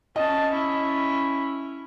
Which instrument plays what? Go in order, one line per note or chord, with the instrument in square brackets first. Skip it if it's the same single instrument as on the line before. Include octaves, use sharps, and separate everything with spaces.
[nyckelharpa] C#4 A5 [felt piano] D#5
[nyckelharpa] C#4 E4